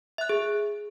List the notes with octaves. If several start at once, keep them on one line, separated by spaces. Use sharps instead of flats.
E5 F#6
G#4